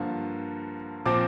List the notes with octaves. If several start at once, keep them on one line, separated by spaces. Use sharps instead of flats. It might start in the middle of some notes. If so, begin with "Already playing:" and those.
Already playing: G2 D3 F3 A#3
A#2 F3 C4 D6